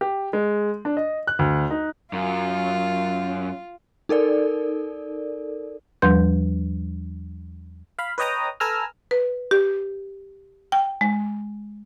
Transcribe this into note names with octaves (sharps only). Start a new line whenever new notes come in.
G4
G#3
D4
D#5
F#6
D2
D#4
F#2 F4
D#4 A4 A#4 D5
E2 F3 G3 B4 C6 G6
F5 B5
B4 C#5 D#5 G5 A#5 D#6
A4 B4 G#5 A#5 E6 F6
B4
G4
G5
G#3